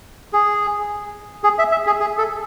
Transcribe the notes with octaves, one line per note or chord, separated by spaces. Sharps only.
G#4
G#4
E5
E5
G#4
G#4
A4